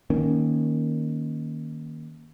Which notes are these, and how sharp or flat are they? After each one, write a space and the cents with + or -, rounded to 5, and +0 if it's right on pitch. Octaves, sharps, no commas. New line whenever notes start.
D#3 +0 A#3 +5 C#4 +0